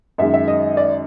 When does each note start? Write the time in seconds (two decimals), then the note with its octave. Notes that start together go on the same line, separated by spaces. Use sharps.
0.18 F#2 D#3 G#3 E5
0.34 E5
0.48 D#5
0.77 D5